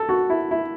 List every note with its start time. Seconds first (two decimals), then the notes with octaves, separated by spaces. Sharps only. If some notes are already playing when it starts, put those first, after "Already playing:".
Already playing: A4
0.09 F#4
0.30 E4
0.51 E4